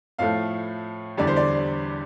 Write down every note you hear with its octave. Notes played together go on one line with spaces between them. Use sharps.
A2 F3 A3 F5
E2 D3 G3 D5
C5
D5